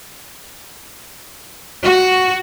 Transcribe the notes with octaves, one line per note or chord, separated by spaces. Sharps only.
F#4